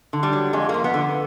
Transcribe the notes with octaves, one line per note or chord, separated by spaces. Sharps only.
D3
G3
F#3
F2 G#3
F2 A#3
B3
D3